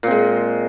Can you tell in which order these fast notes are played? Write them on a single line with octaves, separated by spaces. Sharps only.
A#2 C4 G#3